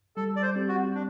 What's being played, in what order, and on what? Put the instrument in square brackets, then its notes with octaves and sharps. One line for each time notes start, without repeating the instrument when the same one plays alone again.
[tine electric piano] G3 [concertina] A4
[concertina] D5
C5
[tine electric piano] C4 G4
[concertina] F#4
D4